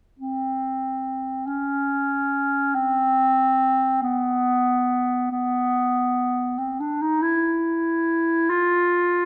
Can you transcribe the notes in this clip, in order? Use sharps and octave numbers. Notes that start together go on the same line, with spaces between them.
C4
C#4
C4
B3
B3
C4
D4
D#4
E4
F4